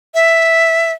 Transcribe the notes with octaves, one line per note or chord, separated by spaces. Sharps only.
E5